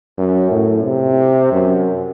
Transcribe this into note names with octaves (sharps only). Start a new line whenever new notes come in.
F#2
A2
C3
F#2